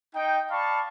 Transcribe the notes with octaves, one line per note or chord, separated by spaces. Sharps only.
D#4 G5
D5 F5 A5 B5 C#6